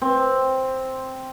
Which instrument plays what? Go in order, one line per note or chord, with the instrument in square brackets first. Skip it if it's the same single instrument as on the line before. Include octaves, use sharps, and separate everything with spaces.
[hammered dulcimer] C4